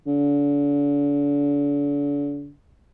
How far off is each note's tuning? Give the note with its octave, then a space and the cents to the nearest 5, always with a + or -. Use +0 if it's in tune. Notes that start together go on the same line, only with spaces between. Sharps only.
D3 -40